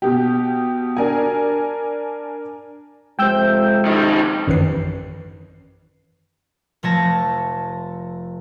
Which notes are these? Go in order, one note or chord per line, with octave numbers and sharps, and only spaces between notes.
B2 G4
D4 A#4 G#5
F2 C3 G#3 C5 G5 E6 G6
D#3 G3
A1 F#2 D#3 E3 B4 C7
F1 F3 A3 C#5 A5 A#6